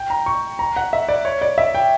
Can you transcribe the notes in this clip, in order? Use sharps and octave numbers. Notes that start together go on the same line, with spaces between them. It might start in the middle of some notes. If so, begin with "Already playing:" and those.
Already playing: G5
A#5
C#6
A#5
F#5
E5
D5
C#5
D5
E5
G5